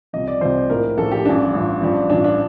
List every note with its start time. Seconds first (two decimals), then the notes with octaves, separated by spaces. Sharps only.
0.13 C2 C3 F3 D#5
0.28 D5
0.41 C2 C3 F3 C5
0.69 A#1 A2 F3 A#4
0.98 A#1 A2 F3 A4
1.12 G4
1.25 A1 G2 F3 D4
1.53 A1 G2 F3
1.82 A1 G2 F3
2.09 A1 G2 F3 D4
2.24 D4